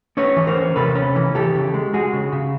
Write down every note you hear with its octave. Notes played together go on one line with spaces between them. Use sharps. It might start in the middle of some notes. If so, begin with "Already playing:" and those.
C#4 B4 C#5
E3
A#4 C5
C#4
C3 A4 B4
C#4
E3
E3 G4 A4
C#3
G#3
G#3 F#4 G#4
C#3
C#3